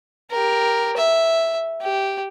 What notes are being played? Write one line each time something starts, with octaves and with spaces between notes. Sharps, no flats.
G4 A#4
E5
G4